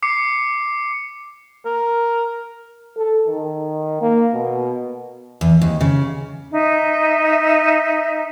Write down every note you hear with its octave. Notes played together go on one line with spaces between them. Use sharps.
D6 C7 C#7
A#4
A4
D#3
A#3
B2
E2
D#2
C#3
D#4 E5